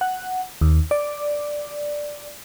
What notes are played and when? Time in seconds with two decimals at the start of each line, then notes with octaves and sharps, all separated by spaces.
0.01 F#5
0.61 D#2
0.91 D5